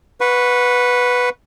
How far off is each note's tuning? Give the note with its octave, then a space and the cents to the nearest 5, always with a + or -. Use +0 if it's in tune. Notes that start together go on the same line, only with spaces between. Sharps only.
B4 +0 F#5 -25 C#6 +0